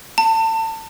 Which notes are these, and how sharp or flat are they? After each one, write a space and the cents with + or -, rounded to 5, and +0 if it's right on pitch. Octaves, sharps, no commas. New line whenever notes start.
A5 +30